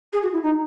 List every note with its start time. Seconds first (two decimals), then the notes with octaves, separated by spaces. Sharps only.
0.13 G#4
0.23 F#4
0.33 E4
0.43 D#4